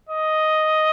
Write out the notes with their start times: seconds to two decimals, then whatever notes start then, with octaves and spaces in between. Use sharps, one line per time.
0.09 D#5